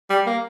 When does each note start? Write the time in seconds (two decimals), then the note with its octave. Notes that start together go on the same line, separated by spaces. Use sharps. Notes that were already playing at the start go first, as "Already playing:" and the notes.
0.10 G3
0.26 A#3